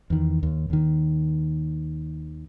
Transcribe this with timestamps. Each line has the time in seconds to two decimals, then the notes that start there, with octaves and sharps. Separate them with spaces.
0.10 E2 D#3
0.43 D#2
0.70 D#2 D#3